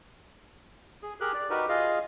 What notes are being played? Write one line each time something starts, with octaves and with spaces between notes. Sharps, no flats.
G#4
G4 G#4 A#4 F#6
D5
D#4 F#4 G4 A#4 B4
F4 G#4 D#5 F5